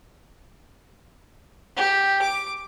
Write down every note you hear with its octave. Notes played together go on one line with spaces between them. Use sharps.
G4
D6